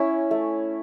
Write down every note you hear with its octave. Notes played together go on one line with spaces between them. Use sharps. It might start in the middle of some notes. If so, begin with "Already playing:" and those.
Already playing: C#4 E4
A3